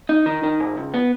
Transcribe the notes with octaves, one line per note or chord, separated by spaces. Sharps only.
D#4
D#3
D#3
G#2
C#2
B3